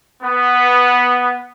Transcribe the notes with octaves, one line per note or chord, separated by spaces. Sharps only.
B3